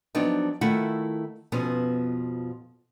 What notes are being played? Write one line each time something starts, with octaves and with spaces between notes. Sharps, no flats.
F3 F#3 B3 C4 D4 D#4
D#3 A3 E4 F4 F#5
F2 B2 F3 B3 C#4